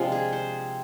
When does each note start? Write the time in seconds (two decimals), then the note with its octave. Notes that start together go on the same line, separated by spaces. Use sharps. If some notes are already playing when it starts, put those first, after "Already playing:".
Already playing: C3 F3 G#3 D4 F4
0.12 G#4
0.33 C5